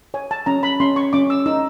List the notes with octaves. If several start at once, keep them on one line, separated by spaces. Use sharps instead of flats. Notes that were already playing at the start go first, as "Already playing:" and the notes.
C#5 G#5
A5
C#4 A#5
B5
C#4 C6
C#6
C#4 D6
E6
D#4 E6